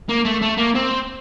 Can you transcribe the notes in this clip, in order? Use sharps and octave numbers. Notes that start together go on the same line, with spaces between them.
A#3
A3
A3
A#3
C4